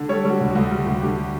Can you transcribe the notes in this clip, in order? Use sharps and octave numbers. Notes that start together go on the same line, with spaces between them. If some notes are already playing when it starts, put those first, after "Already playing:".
Already playing: D3
G3 A4 C#5
G3 F#4
D2
F#4
D2
G3 F#4
D2
D3 G4